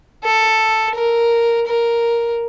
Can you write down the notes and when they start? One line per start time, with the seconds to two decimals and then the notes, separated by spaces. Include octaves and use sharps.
0.24 A4
0.95 A#4
1.66 A#4